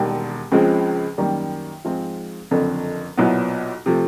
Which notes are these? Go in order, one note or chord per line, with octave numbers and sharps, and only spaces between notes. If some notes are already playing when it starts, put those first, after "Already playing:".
Already playing: E1 D#2 D#3 G3
C#2 C#3 F3 G#3 C4
F#2 D#3 G3 A#3
G#2 F3 G#3 C4 F4
F#1 F2 D3
B1 A#2 F#3 B3 E4
C3 F3 A3